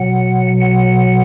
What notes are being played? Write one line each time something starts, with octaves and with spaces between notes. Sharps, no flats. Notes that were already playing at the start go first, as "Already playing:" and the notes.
Already playing: B2 F#3 F#5
F#5